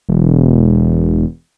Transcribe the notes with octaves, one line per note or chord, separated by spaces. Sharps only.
E1